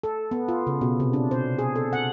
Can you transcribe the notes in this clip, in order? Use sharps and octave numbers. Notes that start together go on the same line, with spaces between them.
A4
B3
F4
C#3
B2
C3
D4
C5
G#4
A4
F#5